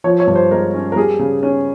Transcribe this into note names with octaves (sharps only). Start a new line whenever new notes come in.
F3 C#5
C#5
G2
C5
G#3 A#4
C#4
A#4
G3 G#4
C#3
C#4